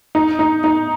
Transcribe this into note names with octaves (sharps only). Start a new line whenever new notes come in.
D#4
D#4
D#4